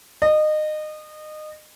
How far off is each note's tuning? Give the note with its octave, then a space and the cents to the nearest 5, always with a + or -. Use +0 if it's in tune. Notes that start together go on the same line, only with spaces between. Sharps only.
D#5 -25